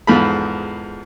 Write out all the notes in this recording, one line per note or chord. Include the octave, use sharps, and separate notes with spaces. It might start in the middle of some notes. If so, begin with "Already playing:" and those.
E2 G#2 F3 F4 A4 B5